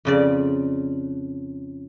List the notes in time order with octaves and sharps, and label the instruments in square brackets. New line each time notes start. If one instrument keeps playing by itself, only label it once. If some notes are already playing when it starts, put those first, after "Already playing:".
[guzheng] F2 C#3 D5